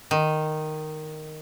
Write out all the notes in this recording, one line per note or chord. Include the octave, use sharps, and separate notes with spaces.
D#3